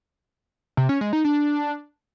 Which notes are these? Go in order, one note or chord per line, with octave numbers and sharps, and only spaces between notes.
C3
C#4
G#3
D#4
D4